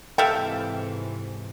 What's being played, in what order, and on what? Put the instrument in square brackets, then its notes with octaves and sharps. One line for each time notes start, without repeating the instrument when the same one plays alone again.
[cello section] G#2 C3 E3 [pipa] A4 E5 F5 [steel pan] G5